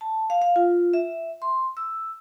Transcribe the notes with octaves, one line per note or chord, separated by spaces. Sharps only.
A5
F5
F5
F4
E5
C6
E6